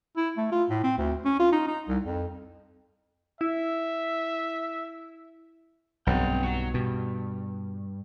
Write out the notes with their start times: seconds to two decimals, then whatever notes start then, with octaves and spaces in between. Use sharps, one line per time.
0.17 E4
0.37 A3
0.52 F4
0.70 A2
0.83 C4
0.98 D2
1.25 C#4
1.40 F4
1.52 D#4
1.67 D#4
1.88 C2
2.04 F2
3.41 E4 E5
6.07 B1 G2 C4 F#5 G5
6.43 F#3 F#4
6.74 G2 B2